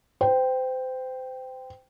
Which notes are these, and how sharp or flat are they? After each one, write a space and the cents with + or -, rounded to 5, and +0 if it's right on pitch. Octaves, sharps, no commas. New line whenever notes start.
C5 -30 G5 +0